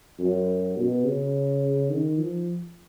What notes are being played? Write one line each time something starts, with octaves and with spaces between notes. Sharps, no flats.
F#2
B2
C#3
D#3
F3